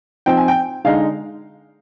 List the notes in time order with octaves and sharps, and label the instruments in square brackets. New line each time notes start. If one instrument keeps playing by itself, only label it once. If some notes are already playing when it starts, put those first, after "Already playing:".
[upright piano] F3 C4 D#4 G5
G#5
G5
D3 G#3 D#4 F5